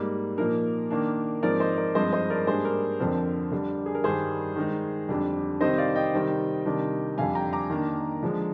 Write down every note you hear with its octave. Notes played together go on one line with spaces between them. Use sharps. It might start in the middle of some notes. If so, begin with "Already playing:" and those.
Already playing: G#2 G3 A#3 D#4
A#2 F3 A#3 D#4 A#4
D#3 A#3 D4
G#2 F3 C4 D#4 A#4 D5
C5 D#5
A#4 D5
G2 F3 G#3 C4 D#4 C5 D#5
C5 D#5
A#4 D5
G#2 G3 A#3 D4 G#4 C5
A#4
F2 D3 F3 C4 A#4
D3 G3 D4
G#4
A#4
G2 D#3 G3 G#4 C5
D#3 G#3 D#4
F2 D3 G3 D4
C3 D#3 G3 C4 D#4 C5 D#5
D5 F5
D#5 G5
C3 D#3 G3 C4 D#4
C3 D#3 G3 D4
F2 D3 G3 F5 G#5
G5 A#5
A#5 D6
D#3 A#3 D4
D3 F3 G#3